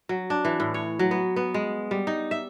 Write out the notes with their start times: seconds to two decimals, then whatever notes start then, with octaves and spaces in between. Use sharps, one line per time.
0.09 F#3
0.30 D4
0.45 E3
0.60 A2
0.74 C#5
0.99 F#3
1.11 B3
1.36 B3
1.54 G#3
1.91 G3
2.07 D#4
2.31 E5